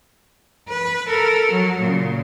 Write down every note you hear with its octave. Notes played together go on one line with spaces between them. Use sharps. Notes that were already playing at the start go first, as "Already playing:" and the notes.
B4
A4 A#4
F#3
A#2 C#3